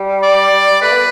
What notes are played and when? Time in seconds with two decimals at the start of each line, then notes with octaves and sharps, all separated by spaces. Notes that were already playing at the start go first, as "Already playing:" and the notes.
Already playing: G3
0.22 D5
0.82 A3 B4
0.92 B3